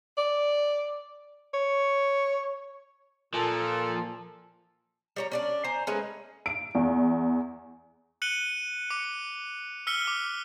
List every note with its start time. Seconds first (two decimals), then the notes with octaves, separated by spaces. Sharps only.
0.18 D5
1.54 C#5
3.34 A#2 F3 A4 G#5 A5
5.16 G3 C#5 A#5
5.32 C#4 D4 D5
5.64 C5 G#5 A#5
5.87 G#3 A3 C#4 B4
6.46 D7
6.75 E2
8.22 F#6 C#7 D#7 F#7 G7
8.90 D6 C#7
9.87 E6 F6 B6 C#7 G7
10.07 D6